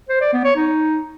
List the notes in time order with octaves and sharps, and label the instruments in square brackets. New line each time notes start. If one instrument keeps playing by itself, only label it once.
[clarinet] C5
D5
B3
C#5
D#4